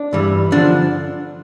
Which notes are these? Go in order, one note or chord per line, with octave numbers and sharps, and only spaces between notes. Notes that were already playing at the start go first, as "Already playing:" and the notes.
Already playing: D4
G2 E3 G3
D3 F3 D4